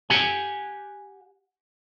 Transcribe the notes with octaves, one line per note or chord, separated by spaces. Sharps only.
G4 F#5 G#5